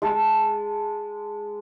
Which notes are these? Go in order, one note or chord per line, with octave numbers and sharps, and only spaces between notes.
G#3 A5